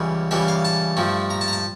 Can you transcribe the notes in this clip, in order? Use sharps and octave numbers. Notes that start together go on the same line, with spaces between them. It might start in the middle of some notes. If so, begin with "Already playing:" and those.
Already playing: C#2 C#3 E3 G3
C#2 C#3 E3 G3 E5
F5
A5
G2 F3 A3
A#5
A5
A#5
A5